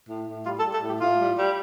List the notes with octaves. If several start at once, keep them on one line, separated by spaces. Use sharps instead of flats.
A2
A2
G3 F4
A4
G3
A4
A2 G4
A2 F4
G3
G3